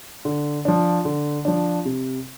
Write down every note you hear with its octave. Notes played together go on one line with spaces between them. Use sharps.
D3
F3 D4
D3
F3 D4
C3